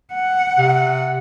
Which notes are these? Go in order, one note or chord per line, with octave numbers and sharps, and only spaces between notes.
F#5
C3